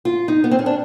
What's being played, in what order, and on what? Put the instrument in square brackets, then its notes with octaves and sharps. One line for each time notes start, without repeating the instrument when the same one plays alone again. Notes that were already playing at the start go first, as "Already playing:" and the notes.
[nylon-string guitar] F4
D#4
B3
C4
C#4
D4